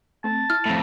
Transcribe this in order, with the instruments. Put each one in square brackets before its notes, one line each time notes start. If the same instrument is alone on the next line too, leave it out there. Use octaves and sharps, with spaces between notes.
[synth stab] A3 C4 [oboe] A5
[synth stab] E4 [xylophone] F6
[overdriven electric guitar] F2 A2